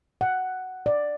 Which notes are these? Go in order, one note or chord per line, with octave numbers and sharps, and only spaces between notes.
F#5
D5